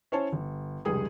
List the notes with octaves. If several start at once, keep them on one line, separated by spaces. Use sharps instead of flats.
C#4 E4 C5 C#5 G#5 A5
G1
F1 C#2 G3 G#4 D#6